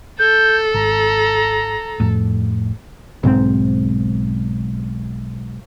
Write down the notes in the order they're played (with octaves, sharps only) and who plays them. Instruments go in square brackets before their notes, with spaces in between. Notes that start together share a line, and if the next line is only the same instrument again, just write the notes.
[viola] A4 [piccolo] G6
[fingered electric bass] G#1 [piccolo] A#5
[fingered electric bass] F2 A2
[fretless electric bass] B1 G#2 F#3 C4